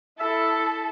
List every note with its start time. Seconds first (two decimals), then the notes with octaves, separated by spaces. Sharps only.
0.20 E4 A4 E5